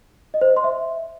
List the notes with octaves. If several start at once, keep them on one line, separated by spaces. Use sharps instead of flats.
D#5
C5
D#5
C6
E5